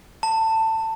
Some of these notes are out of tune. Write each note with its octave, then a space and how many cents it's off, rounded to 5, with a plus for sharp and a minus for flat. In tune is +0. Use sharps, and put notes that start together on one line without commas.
A5 +20